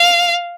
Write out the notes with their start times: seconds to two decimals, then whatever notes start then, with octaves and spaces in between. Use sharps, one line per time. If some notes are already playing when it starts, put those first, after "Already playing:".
Already playing: F5